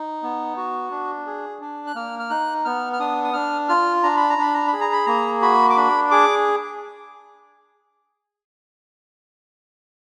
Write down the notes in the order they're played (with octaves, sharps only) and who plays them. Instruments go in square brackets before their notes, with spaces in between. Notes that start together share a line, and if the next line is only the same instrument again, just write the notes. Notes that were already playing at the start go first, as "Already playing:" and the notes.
Already playing: [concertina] D#4
B3
F#4
D4
G#4
D4
F#6
A#3 F6
F6
D#4 F#6
B3 F6
F6
D4 D#6
D#6
D4 F6
F4 F6
D4 A#5
B5
A#5
D4 B5
A#5
B5
G#4
A#5
B5
A#3 A#5
F#4 B5
D6
D4 B5
G#4 D6